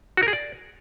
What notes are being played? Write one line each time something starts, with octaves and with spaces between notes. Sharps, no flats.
F#4
A#4
G#4
D5